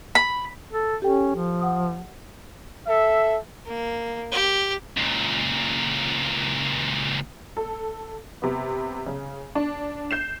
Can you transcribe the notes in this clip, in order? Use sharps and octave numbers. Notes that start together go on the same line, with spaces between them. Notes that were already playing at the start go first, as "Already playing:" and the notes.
B5
A4
C#4 G4 A4 G5
F3
F#5 D#6
A4 E5
A#3
G4
C#2 A#2
A4
C3 B3
C#3
D4
G6 C7 E7